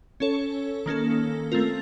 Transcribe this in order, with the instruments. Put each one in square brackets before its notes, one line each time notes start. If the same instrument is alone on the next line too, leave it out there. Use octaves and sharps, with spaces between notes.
[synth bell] C#4 A4 C#5
D#3 A#3 C#4 A4
A3 C4 F4 A#4